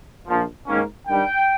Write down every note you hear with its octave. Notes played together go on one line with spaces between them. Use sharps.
A#1 A#2 F3
G#2 D#3 A#3 C#4
G2 D#3 G3 G5